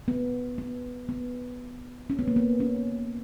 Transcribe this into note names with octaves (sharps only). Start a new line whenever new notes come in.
B3
B3
B3
C#4
B3
A#3
B3
C#4